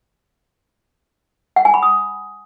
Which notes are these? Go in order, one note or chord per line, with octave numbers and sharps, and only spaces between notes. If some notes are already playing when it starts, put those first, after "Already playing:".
F#5
G#5
B5
D#6